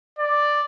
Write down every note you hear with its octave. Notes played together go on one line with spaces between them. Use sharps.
D5